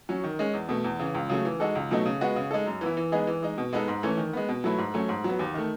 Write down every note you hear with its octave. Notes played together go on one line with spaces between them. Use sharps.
F#3 C#4
D#3
G#3 C#4
E2
B2 A3
E2
C#3 E3
C#2
C#3 F#3 A3
E3
G#3 D#4 F#4 A4
C#2
B2 F#3 A3 D#4
C#3
G#3 B3 F#4
C#3
G#3 D#4 A4
F#2
E3 B3 E4
E3
G#3 B3 D#4 G#4
E3
G#3 D#4
B2
G#3 B3 D#4 A4
G#2
E3 A3 C#4
D#3
G#3 B3
B2
F#3 A3 E4 B4
G#2
F#3 A3 C#4
G#2
F#3 B3
D#2
D#3 A3